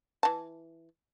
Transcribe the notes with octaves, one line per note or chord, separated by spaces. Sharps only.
E3 A5